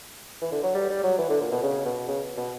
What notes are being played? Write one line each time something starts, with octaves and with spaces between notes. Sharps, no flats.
E3
D3
F#3
G3
G3
F#3
E3
D3
A#2
B2
C#3
B2
C#3
B2